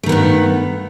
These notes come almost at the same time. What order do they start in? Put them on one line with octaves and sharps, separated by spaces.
A3 D#3 B3 G2